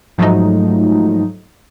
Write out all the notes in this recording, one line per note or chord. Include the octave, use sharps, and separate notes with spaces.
G#2 F3 F#3 A3 D#4